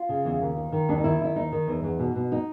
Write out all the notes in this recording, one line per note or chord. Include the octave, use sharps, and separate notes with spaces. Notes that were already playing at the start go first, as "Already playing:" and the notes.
Already playing: F4
C#3
E2
D#2
D#3
D#3
D#2 D4
D#4
D#3 E4
D#3 E4
D#2 D#4
D#3
E2
E2
B2
B2
D#4